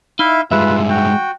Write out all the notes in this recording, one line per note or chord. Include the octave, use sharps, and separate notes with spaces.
D#4 E4 E5 F5
G2 G#3 F4 B4 E5
F#4 G5